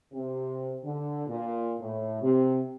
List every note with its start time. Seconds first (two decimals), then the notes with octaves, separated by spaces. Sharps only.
0.12 C3
0.84 D3
1.27 A#2
1.79 A2
2.21 C3